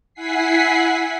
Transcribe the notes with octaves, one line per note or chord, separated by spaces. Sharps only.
E4 F#5 G#5 B6 C7